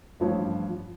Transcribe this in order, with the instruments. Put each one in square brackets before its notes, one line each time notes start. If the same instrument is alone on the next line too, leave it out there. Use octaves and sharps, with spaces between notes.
[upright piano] A1 G2 F3 C#5